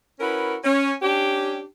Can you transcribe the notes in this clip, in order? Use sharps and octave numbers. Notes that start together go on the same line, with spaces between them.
C#4 E4 F#4 A#4 B4
C#4
C#4 D4 G4